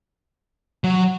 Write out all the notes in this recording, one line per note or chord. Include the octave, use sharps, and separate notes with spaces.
F#3